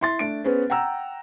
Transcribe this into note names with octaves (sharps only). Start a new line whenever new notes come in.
E4 C6 A6
A3 D4 D7
B3 C#4 G#4 B4 C5
F#5 G5 A#5 E6